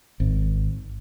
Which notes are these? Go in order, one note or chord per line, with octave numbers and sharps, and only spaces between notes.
G#1